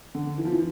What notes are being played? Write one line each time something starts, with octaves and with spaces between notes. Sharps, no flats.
D3
E3
F3
E3